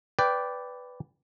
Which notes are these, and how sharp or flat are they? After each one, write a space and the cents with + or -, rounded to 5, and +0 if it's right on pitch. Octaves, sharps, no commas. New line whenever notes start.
B4 +10 D5 -10 G5 +0